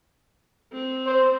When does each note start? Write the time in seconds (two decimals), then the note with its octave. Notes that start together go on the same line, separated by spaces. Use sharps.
0.73 C4
1.07 C5